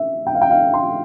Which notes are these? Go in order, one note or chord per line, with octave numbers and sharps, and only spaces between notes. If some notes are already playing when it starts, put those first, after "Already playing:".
Already playing: E5
G5
F5
G5
F5
C6